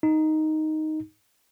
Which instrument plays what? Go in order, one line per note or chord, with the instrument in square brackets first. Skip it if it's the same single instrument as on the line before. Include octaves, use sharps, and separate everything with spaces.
[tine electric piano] D#4